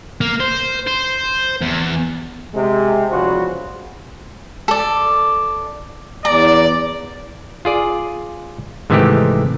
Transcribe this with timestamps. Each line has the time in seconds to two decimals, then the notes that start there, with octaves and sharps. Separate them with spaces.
0.21 A#3
0.40 C5
0.87 C5
1.61 E2
2.54 C3 G#3
3.11 E2 C#3 F3 G3 F#4 C5
4.68 A4 D5
6.25 E2 D5 A#5
7.65 F4 G#4 D5
8.90 G#2 C3 D#3 E3 A3 G4